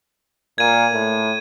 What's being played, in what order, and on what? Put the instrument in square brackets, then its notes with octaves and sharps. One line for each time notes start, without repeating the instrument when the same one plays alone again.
[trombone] A#2 [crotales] G#6 D#7
[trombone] A2